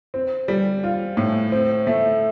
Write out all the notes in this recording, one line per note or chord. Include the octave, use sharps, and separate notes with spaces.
C4
G3
F4
A2
C4
A3